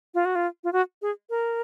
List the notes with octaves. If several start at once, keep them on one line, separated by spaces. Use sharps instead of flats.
F4
F#4
F4
F4
F#4
G#4
A#4